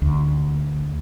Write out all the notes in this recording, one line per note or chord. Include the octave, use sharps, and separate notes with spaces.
D2